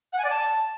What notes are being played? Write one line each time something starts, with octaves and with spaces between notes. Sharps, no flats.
F#5
G#5
D5
A5